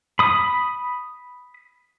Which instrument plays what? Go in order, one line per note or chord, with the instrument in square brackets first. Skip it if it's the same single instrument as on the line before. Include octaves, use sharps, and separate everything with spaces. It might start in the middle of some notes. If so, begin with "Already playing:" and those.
[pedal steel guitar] B5 D#6